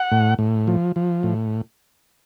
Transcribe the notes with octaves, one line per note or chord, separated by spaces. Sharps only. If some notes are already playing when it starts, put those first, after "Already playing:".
Already playing: F#5
A2
A2
F3
F3
A2